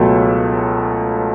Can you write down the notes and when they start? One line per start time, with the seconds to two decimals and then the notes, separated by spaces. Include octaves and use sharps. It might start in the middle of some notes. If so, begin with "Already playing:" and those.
Already playing: C#2 B2 F#3 A3